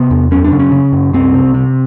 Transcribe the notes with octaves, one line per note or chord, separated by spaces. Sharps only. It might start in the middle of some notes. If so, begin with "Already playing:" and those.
Already playing: C3 B3
E2
F#2 C#4
D4
C#3
C#4
C#3
F#2
C2 C4
C3
C3